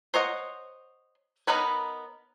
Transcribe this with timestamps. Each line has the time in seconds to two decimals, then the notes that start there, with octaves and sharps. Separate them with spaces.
0.14 C5 C#5 D#5 F#5
1.47 B3 D#4 A#4 B4 C#5